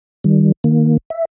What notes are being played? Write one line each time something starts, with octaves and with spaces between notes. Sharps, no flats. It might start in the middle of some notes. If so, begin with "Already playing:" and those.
D#3 G3
D#3 A#3
E5